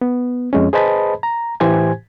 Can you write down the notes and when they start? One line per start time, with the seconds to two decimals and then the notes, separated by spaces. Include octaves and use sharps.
0.01 B3
0.53 F2 G#3 C#4
0.73 G#4 B4 C5 D#5 A5 B5
1.23 A#5
1.60 A2 E3 G4 C5 G#5 G#6